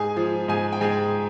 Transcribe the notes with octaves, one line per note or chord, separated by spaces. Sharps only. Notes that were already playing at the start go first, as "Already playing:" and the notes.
Already playing: G#2 G#4 G#5
F3
G#2 G#4 G#5
G5
G#2 G#4 G#5